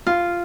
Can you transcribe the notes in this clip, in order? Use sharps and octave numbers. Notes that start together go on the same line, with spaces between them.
F4